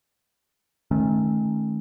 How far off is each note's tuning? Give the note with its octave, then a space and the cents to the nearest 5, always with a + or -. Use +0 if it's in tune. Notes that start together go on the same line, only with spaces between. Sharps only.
D#3 +0 A3 -30 C#4 -35